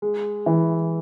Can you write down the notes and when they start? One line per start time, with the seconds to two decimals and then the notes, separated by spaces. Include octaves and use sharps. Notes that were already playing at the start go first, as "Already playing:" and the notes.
0.02 G#3
0.46 E3